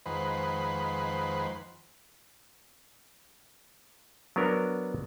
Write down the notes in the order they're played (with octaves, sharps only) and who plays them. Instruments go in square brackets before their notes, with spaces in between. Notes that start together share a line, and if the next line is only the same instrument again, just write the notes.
[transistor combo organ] F2 D#3 G#3 B4 C5 F#5
[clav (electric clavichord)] F#3 B3 D4 A#4